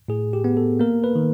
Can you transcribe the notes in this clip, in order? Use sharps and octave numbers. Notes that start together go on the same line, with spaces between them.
A2 G#4
G4
B3
A4
A#3 A#4
B4
D#3